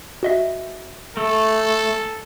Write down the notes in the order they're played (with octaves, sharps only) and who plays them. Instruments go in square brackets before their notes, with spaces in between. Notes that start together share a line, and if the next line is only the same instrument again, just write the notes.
[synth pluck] F#4 D#5 E5
[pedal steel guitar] A3 [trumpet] A4